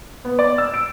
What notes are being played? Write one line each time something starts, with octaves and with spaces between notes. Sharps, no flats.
B3
D5
E6
D7